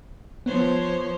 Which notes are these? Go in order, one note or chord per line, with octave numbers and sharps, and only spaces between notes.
F3 B3 C5 C#5